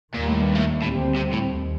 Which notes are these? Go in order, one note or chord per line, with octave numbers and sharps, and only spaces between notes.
D#2 A#2 D#3 G3 A#3
A2
G2
A2
D2 A2 D3 G3 C4
C3
A2
D#2